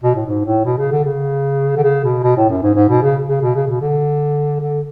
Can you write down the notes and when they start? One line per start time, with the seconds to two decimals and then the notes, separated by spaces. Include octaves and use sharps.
0.03 B2
0.15 A2
0.26 G#2
0.45 A2
0.65 B2
0.78 C#3
0.92 D3
1.04 C#3
1.77 D3
1.84 C#3
2.04 B2
2.23 B2
2.37 A2
2.49 F#2
2.63 G#2
2.75 G#2
2.89 B2
3.02 C#3
3.28 C#3
3.42 B2
3.55 C#3
3.67 B2
3.81 D3
4.60 D3